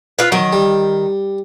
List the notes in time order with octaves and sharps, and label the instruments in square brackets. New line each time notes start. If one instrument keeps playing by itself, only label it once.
[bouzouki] F4 B4
[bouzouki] D#3 [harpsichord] F#3
[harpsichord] G3